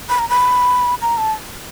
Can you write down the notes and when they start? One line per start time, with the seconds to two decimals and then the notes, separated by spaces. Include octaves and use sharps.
0.09 B5
0.19 A#5
0.29 B5
1.02 A#5
1.18 A5